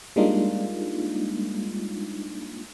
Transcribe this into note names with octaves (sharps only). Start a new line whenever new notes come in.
G3 G#3 A#3 D4 D#4 F4